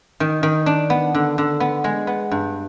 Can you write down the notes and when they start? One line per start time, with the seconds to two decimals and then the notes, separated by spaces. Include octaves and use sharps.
0.20 D#3
0.43 D#3
0.66 D4
0.90 B3
1.15 D3
1.38 D3
1.60 B3
1.84 G#3
2.07 B3
2.31 G2